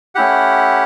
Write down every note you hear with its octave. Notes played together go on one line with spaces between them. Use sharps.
A3 C#4 E4 G4 F#5